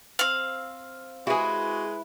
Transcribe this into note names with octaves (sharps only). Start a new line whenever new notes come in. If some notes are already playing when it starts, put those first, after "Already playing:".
C4 F5
G#3 E4 F#4 G#4 B4